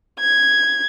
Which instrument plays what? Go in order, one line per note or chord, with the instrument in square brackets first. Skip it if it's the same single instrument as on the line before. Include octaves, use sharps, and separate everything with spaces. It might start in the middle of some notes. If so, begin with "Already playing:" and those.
[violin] G#6